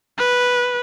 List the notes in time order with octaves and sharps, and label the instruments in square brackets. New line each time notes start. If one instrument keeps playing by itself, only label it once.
[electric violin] B4